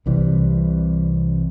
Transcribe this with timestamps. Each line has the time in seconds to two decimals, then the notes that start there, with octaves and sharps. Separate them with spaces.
0.06 C2 C3 E3 G3